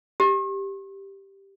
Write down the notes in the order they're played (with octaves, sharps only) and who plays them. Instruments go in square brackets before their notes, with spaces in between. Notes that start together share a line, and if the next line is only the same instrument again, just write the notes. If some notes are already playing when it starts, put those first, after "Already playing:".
[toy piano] G4